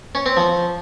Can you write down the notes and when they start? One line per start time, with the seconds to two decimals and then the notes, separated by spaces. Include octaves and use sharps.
0.15 C#4
0.26 C4
0.37 F3